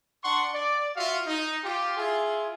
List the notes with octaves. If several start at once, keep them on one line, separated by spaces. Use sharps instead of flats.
D4 F#5 C6 C#6
D5
F4 F#4 E5 F5
D#4
F4 G4
E4 F4 G#4